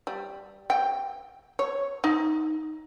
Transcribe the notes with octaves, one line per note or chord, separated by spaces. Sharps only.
G3
G5
C#5
D#4